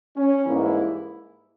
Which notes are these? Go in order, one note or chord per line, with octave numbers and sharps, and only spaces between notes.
C#4
G#2 E3 G3 A#3 E4